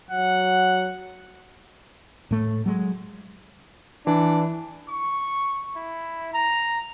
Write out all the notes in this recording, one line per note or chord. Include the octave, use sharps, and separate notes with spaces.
F#3 F#5
A2 A3
F#3 G#3
E3 D4
C#6
E4
A#5